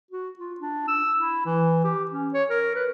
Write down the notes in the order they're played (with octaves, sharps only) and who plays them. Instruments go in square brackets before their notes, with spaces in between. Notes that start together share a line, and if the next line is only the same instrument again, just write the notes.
[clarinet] F#4
F4
D4
E6
E4
E3
G4
C#4
C#5
A#4
B4